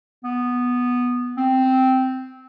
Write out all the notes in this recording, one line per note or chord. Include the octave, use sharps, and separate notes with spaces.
B3
C4